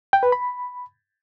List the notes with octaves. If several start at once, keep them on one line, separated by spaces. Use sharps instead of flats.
G5
B4
B5